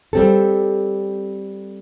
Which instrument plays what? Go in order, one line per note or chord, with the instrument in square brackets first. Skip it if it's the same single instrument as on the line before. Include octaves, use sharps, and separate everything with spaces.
[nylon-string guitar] G3 C4 A4